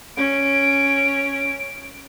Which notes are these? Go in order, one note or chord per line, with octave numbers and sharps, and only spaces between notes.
C#4 D7